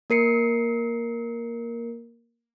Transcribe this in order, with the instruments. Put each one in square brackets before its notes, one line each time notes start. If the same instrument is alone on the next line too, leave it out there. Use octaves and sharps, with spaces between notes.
[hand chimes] A#3 A#4 C7 C#7